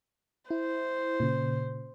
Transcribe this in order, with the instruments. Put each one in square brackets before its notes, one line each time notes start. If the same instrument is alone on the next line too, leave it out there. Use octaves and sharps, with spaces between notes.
[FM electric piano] E4 [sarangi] C5
[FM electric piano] A#2 C#3